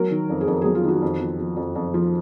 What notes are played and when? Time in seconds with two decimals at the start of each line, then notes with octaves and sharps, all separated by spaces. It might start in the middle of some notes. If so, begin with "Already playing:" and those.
Already playing: F#3 A#4
0.11 D#3
0.30 F2
0.41 G#4
0.47 F2 A#4
0.62 F#3 G#4
0.75 F4
0.84 D#3 F#4
1.02 F2
1.20 F3
1.39 F3
1.57 F2
1.75 F2
1.94 F3